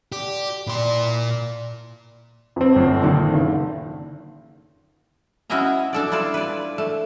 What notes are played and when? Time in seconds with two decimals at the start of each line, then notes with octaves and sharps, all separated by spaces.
0.12 D3 G4
0.67 A#2 E4 D5 A5 C6
2.56 F2 C4
2.76 G1 F#2
3.02 A#2 D3 D#3
3.34 F#1
5.50 C#4 E4 F#4 D#5 G#5 A#5
5.93 D4 A4 D5
6.12 E4 F4 A4 D5
6.34 B4 D5
6.78 A3